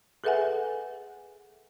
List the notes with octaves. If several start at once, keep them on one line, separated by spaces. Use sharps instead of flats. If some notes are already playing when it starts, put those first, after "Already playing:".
G#4 A4 B4 E5 F#5 G#5